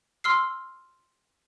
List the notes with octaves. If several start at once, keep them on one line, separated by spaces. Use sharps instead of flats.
C6 E6 F6 C7